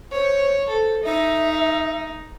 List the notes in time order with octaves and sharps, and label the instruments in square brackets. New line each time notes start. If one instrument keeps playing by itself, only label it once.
[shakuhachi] C5 [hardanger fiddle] C#5
[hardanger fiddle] A4 [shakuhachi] C5
[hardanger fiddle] D#4 [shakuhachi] E5